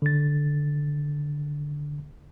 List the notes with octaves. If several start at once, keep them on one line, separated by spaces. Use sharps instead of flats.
D3 A6